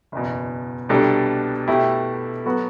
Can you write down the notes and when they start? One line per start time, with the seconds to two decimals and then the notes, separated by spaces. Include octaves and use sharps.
0.12 F#1 E2 B2
0.89 C2 B2 G3 D4 A4
1.68 B2 A3 E4 G4
2.46 F#3 B3 F#4 A4